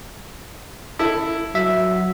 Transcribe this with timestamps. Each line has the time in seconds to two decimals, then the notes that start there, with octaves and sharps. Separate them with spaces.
0.99 E4 A4
1.55 F#3 E5